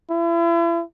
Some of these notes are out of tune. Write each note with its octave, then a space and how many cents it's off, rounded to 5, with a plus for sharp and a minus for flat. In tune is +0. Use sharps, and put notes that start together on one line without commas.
E4 +40